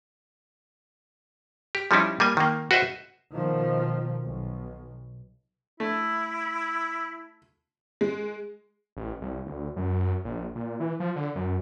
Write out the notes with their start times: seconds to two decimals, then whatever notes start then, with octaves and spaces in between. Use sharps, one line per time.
1.75 G4
1.91 F3 G3 C#4 D#4 E4
2.20 G3 A#3 G#5
2.37 D#3 A#3
2.71 F#4 B4 C5 D#5 E5
3.33 B2 D#3 F3
4.24 B1
5.80 A3 E4
8.01 G#3
8.97 A1
9.22 C2
9.46 D2
9.76 F#2
10.25 A#1
10.56 A#2
10.80 E3
11.00 F3
11.16 D3
11.36 F#2